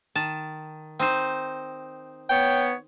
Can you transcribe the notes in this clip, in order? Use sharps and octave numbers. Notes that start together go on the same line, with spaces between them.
D#3 A5
C4 D#4 C5
B3 C#5 G5